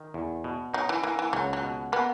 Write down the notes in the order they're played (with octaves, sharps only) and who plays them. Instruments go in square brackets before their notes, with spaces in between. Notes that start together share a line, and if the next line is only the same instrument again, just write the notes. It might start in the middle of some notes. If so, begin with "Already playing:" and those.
Already playing: [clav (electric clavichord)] D#3
E2
B2
[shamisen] F#3 [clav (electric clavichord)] D#4
[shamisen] E3
[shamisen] E3 [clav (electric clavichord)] A#3
[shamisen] E3
[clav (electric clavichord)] C#2 [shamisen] F#3
[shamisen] F#3
[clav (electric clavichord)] B2
[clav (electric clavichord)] A#3 [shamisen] B3